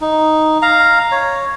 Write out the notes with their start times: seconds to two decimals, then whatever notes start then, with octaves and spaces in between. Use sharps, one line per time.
0.01 D#4
0.62 F5 A#5
1.12 C#5